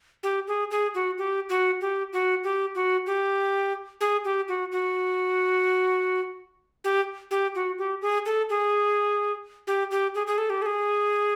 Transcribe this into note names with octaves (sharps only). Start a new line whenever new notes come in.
G4
G#4
G#4
F#4
G4
F#4
G4
F#4
G4
F#4
G4
G#4
G4
F#4
F#4
G4
G4
F#4
G4
G#4
A4
G#4
G4
G4
G#4
G#4
A4
G4
A4
G#4